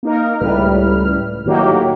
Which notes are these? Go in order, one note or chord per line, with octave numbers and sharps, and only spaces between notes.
A#3 D#4 A#4
C#2 A2 G3 B4 F6
A2 D#3 F#3 A#3 F#4 G4